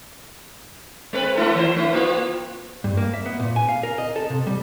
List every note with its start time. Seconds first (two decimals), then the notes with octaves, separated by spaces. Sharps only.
1.13 G#3 C4 B4
1.35 A3 E4 A4
1.55 E3 C5
1.76 A3 E4
1.93 A#3 F4
2.84 G2
2.97 A#3
3.14 E5
3.26 B3
3.40 A#2
3.56 G#5
3.69 F5
3.83 A#4
3.98 D#5
4.16 A4
4.30 C3
4.47 G3